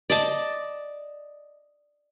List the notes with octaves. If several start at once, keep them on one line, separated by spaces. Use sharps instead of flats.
D5 D#5 A5